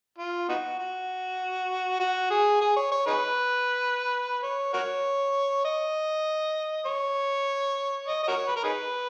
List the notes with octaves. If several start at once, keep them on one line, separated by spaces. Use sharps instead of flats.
F4
B3 D#4 F#4
F#4
F#4
G#4
G#4
C#5
C#5
D#4 G#4 B4
C#5
F#4 A#4 C#5
D#5
C#5
D#5
D#5
F#4 A#4 C#5
B4
A#4
D#4 G#4 B4